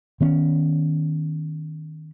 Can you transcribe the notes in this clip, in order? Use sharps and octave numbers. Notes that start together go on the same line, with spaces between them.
D#3 B3 C#4